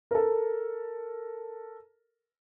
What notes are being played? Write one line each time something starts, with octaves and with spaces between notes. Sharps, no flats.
A4 A#4